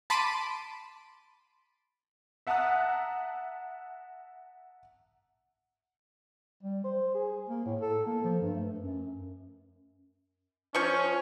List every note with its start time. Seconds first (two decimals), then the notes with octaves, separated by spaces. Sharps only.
0.10 A5 B5 C6 D6 D7 D#7
2.47 E5 F#5 A5 A#5 D#6 F#6
6.63 G3
6.84 C5
7.15 G#4
7.49 A#3
7.66 A2
7.81 A4
8.06 A#3
8.24 F3
8.41 G2
8.55 A3
8.79 F#2
10.75 F3 C#4 C#6